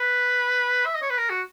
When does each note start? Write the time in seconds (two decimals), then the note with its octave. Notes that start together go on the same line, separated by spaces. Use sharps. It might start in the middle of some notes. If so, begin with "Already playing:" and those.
Already playing: B4
0.85 E5
0.95 D#5
1.02 C#5
1.10 B4
1.18 A#4
1.30 F#4